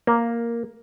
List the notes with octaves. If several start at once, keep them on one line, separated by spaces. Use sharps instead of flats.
A#3